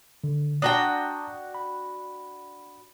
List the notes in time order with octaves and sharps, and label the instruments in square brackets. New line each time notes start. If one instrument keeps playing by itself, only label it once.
[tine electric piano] D3
[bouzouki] D4 F#4 G5 [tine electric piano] A5 A#5 D#6
[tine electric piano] B5